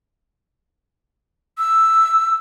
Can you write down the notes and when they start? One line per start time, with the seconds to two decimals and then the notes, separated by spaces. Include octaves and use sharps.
1.58 E6